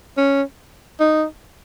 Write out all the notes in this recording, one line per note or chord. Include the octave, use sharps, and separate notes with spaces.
C#4
D#4